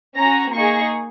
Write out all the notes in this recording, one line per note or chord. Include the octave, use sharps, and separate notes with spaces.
C#4 F#4 A#5
A#3 D#4 G#4 C#6